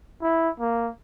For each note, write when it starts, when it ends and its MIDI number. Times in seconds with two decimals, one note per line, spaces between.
0.22 0.50 64
0.60 0.89 58